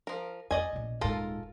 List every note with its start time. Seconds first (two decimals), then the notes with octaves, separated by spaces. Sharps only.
0.07 F3 A#4
0.51 F2 D5 D#5 G#5
0.72 A#1 B2
1.01 D#1 G#2 F4 A4 A#4